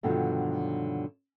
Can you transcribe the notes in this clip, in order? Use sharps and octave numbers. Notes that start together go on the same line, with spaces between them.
G2 B2 D3 D#3 F3 F#3